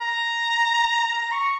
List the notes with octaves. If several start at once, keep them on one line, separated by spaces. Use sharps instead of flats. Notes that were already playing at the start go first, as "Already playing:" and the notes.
A#5
A#5
C#6